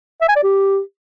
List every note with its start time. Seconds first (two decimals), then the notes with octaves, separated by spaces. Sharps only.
0.21 E5
0.29 G#5
0.36 D5
0.43 G4